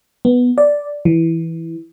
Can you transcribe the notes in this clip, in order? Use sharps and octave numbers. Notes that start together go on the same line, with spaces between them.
B3
D5
E3